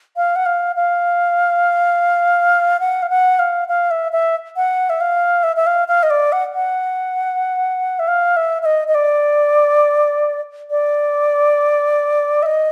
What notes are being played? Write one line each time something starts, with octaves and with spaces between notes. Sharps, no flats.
F5
F#5
F5
F5
F#5
F5
F#5
F5
F5
E5
E5
F#5
E5
F5
E5
E5
F5
F5
D#5
D5
F#5
F#5
E5
F5
E5
E5
D#5
D#5
D5
D5
E5
D#5